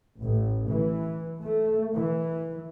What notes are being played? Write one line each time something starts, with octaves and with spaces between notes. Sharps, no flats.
A1
E3
A3
E3